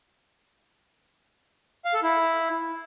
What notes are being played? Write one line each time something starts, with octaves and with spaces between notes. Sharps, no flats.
F5
A4
E4